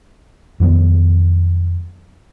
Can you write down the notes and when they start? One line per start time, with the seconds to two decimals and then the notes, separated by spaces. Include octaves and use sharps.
0.60 F2 D#3 F#3 B3